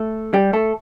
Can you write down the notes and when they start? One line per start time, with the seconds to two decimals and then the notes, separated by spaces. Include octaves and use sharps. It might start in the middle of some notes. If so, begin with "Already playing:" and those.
Already playing: A3 A4
0.34 G3 G4
0.53 A3 A4